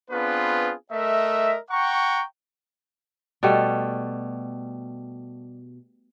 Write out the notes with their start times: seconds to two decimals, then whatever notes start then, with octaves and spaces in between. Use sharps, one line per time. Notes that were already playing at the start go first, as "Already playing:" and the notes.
0.11 B3 C4 D4 F4 G#4 B4
0.92 A3 A#4 D#5 E5
1.71 F#5 G5 A#5 C#6
3.43 B2 G3 A3